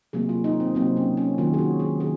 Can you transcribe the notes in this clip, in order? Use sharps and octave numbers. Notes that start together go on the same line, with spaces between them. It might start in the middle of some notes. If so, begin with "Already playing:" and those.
C3 F#3 A#3 G#4
F4
D#4
C4
C3 F#3 A#3 C4
C#4
C#4
D#3 F#3 A#3 F4
G#4
F#4
G#4
D#3 G#4